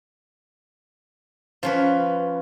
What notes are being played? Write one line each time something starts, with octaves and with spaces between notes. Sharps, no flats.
F3 C#4 B4